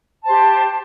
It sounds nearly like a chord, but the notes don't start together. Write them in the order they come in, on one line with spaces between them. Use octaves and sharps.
A5 C5 G4